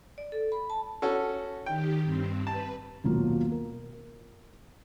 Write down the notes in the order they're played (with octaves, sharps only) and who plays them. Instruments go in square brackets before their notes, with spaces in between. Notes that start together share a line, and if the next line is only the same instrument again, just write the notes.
[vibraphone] D5
A4
B5
A5
[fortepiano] C#4 F#4 A4
[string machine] D#3 G4 [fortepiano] G5
[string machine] G2 C4
[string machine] B4 [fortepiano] A5
[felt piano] D#1 B1 F#3 A#3 F4
A#4